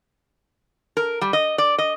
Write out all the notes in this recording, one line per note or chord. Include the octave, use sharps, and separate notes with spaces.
A#4
G3
D#5
D5
D#5